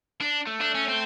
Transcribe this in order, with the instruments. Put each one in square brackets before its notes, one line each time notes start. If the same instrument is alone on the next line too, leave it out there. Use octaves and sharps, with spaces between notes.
[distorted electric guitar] D4
[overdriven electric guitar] A3
[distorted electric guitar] D4
C#4
C4